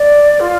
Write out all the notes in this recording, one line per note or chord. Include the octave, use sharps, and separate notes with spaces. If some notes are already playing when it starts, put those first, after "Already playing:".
Already playing: D5
F4